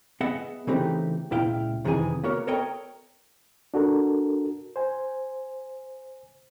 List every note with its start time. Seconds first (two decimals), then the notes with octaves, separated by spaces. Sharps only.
0.21 B3 G#4 D#5 E5 F#5
0.67 C#3 E3 A3 C4 D#4 G4
1.31 C#2 A#2 E4 F5 G5
1.85 F2 C3 D#3 E3 G#4 G#5
2.24 A#3 F#4 A#4 C#5
2.47 A4 A#4 C#5 D#5 G5 A#5
3.74 D4 F#4 A4 A#4
4.76 C5 G#5